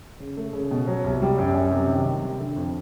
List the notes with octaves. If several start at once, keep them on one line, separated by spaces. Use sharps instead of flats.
C#3
A3
C#3
B2
F#3
C2
G3
F#2
F#2
C3
D#3
C3
G3
D3
F2